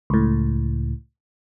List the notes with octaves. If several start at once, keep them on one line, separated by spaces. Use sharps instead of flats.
C#2 A2